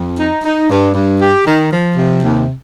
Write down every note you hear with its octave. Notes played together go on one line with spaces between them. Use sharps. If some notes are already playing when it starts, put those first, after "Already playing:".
Already playing: F2
D#4
D#4
G2
G2
G4
D#3
F3
C3
D#2